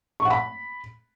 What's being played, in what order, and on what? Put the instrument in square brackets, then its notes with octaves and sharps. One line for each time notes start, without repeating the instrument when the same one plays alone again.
[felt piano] C#6
F#5
B5